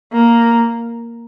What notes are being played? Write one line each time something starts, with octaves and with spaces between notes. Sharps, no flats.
A#3